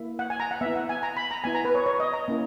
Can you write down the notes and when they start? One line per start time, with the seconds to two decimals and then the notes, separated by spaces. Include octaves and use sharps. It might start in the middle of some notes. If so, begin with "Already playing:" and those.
Already playing: A#3 E4
0.19 F#5
0.30 G#5
0.40 A#5
0.51 F#5
0.61 B3 E4 E5
0.75 F#5
0.89 G#5
1.03 A#5
1.17 B5
1.31 A#5
1.44 B3 E4 G#5
1.55 A#5
1.65 B4
1.75 C#5
1.86 C#5
2.00 D#5
2.13 A#5
2.28 A#3 C#4 E4